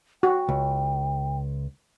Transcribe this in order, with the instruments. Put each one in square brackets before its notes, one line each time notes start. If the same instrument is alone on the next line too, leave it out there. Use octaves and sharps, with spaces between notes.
[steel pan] F#4 [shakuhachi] G5
[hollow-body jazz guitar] C#2